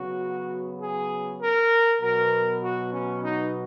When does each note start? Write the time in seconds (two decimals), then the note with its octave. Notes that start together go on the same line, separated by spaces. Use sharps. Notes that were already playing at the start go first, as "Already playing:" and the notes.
Already playing: C#3 F#3 B3 F#4
0.82 G#4
1.41 A#4
2.02 B2 F#3 B3 A#4
2.64 F#4
2.93 C#4
3.24 D#4